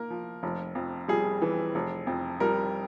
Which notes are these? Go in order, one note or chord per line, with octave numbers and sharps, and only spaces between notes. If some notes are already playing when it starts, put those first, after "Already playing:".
Already playing: A#3 A#4
F3
F1
F2
G3 G#4
E3
F1
F2
G3 A#4